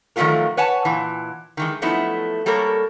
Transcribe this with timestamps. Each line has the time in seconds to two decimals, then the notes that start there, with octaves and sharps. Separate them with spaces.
0.16 D#3 F3 F#3 A3 F4 A#4
0.57 B4 C#5 F#5 G#5 A5
0.85 A#2 E3
1.57 D#3 E3 G#3
1.82 F3 F#3 A3 B3 D#4 E4
2.46 G3 A#3 A4 A#4 C#5